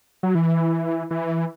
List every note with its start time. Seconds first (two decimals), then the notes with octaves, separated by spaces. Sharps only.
0.23 F#3
0.35 E3
1.11 E3